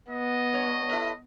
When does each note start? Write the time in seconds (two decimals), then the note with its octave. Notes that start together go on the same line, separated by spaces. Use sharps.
0.10 B3 D#5
0.53 G2 C#5
0.89 E4 A4 B4